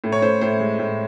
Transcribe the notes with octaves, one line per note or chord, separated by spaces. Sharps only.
A2
C#5
A2 C5
A2 C5
G#3
A2